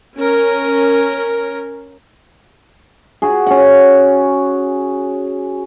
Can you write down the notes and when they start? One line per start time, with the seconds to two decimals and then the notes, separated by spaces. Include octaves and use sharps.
0.17 C#4 A#4
3.22 F#4 G#4
3.47 C#4 F#5